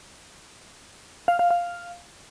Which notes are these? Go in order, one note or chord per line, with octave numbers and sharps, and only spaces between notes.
F5
F5
F5